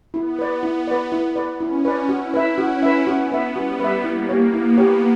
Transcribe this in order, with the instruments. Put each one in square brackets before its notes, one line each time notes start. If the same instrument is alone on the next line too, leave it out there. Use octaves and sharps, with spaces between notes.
[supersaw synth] B3 [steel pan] E4
[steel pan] B4 D5
E4
B4 D5
E4
B4 D5
[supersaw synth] C#4 [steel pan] E4
[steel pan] B4 D5
[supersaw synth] E4 [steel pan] F#4
[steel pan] B4 E5
[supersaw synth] C#4 [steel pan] F#4
[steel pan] B4 E5
[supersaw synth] B3 [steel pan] F#4
[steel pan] B4 E5
[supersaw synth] G3 [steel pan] F#4
[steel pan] B4 E5
[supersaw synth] A#3 [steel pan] E4
[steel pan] G4 C#5
[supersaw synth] B3 [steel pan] E4
[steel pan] G4 C#5